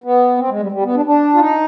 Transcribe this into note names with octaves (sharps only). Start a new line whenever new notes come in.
B3
C4
G#3
G3
G3
B3
D4
D4
F4
D#4